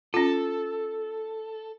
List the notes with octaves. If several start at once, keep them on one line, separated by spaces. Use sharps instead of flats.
C#4 F4 A4